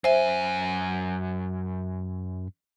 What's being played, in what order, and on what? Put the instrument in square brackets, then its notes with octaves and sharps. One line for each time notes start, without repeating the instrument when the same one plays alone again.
[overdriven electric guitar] F#2 G#5 [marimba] C5 E5